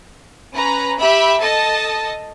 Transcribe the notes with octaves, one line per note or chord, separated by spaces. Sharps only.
C#4 B4 A#5
G4 E5 B5
A4 D#5 A5